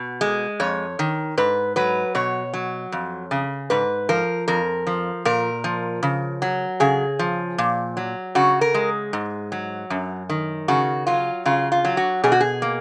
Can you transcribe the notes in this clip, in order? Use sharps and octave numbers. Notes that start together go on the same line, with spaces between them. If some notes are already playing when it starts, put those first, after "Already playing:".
Already playing: B2
G#3
F2 C#5
D#3
G#2 B4
F#3 B4
B2 C#5
F#3
F2
C#3
G#2 B4
F3 A#4
F2 A#4
F3
A#2 A#4
F3
C#3
F#3
C#3 G#4
F3
A#2
F#3
C#3 F#4
A#4
G#3
G#2
F#3
F#2
D#3
C#3 F#4
F#3 F4
C#3 F4
F4
F#3
F#4
B2 G#4
F#4
G#4
A#3